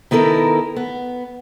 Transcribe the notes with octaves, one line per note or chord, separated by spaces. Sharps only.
D#3 B3 E4 A4 A#4
B3